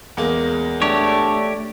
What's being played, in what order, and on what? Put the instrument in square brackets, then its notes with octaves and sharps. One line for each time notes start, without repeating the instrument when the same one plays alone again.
[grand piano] E2 G#3 A#3
[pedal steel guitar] A3 G4 C#5 [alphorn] D4